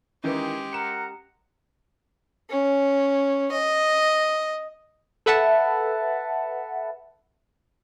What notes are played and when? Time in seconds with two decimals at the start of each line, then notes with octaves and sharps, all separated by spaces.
0.24 D#3 E3 G#3 C#4 D#4 G4 B4
0.73 A#4 F#5 A#5 C#7 E7
2.50 C#4
3.52 D#5
5.26 A4 B4 E5 F#5 A5